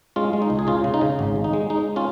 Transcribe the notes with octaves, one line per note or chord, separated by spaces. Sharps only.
G#3 C#4 F4
G#3
D#4
C#2
G#4
C#3 C#4 F4
C#3
D#4
C#3
G#1
G#3
D#4
G#3
G#3 D#4
C#4 F4